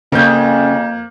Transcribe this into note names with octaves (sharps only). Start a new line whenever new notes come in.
F2 C#3 A#3 G6